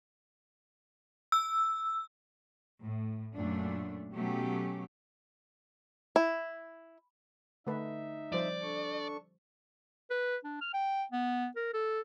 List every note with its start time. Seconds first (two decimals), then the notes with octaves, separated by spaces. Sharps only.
1.32 E6
2.84 A2
3.35 F#2 A#2 A3 D4
4.14 B2 F#3 A3 C#4 G4
6.16 E4
7.67 D3 A3 D#4 B4 E5
8.32 F3 G3 C5 D5
8.62 D4 A4 C#6
10.10 B4
10.44 D4
10.61 F6
10.73 G5
11.12 B3
11.56 A#4
11.73 A4